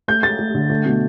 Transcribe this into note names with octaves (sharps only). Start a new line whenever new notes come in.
A3 G6
A3 A6
A3
D3
A3
B2